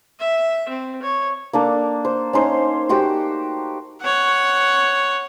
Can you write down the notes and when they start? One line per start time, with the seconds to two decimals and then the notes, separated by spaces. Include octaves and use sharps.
0.19 E5
0.69 C4
1.03 C#5
1.53 A#3 D4 A4
2.05 C5
2.33 C#4 D#4 C5
2.89 F#4 G4 C5 G5
4.02 C#5 F#5